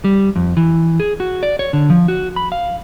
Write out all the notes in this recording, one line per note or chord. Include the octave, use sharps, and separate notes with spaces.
G3
F2
E3
G#4
F#4
D5
C#5
D3
F3
F#4
B5
F5